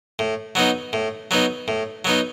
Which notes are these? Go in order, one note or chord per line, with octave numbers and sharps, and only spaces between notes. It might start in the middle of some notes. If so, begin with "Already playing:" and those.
A2
F#3 B3 D#4
A2
F#3 B3 D#4
A2
F#3 B3 D#4